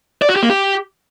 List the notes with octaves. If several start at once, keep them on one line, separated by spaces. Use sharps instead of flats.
D5
F#4
G4
A#3
G4